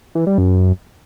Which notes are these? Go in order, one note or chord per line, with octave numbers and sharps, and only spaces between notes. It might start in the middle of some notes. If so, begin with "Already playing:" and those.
E3
G3
F#2